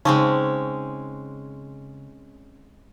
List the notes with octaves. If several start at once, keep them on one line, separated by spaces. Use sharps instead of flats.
C#3 G#3 C4 C#4 D#4 C#6 D6